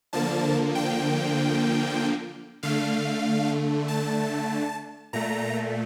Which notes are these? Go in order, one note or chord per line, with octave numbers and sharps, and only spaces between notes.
D3 F3 A#3 A5
G5
D3 A3 F5
A5
A#2 A3 A#5